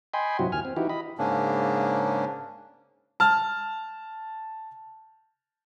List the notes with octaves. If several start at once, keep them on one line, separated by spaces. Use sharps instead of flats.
D#5 G5 G#5 B5 C6
G2 C3 F3 F#3 E4 F#4
D#2 G#5 F6
C4
E3 D#4 E4 F#4 G4
D#5 B5
G#2 C#3 A#3 C#4 D4
A5 F6